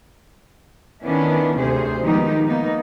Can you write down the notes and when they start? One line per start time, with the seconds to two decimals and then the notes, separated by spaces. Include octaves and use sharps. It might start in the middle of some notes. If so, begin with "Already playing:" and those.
1.04 D#3 B3 C#4 D4 E4
1.58 D2 C3 G#4 C5
2.03 D#3 F3 G#3 B3 D#4 G4
2.46 A#3 B3 D#4